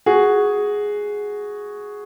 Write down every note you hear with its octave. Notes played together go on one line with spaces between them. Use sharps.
F#4 G#4